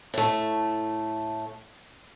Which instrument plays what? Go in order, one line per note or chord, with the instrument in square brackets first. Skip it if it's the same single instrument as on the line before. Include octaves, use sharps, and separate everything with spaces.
[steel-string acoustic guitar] A2 A3